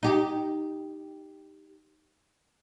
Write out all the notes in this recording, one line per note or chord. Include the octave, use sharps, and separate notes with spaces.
D#4 G4